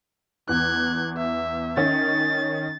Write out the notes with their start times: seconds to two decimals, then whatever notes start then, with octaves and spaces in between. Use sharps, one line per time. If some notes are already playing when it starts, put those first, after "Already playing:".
0.49 E2 F#6 G#6
1.18 E5
1.77 D#3 C#4 A6